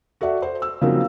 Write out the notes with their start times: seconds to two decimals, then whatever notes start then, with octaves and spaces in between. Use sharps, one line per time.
0.21 F#4 A4 D5 E5 F#5
0.42 C5
0.62 E6
0.81 C#3 F3 F#3 A#3 C4 D#4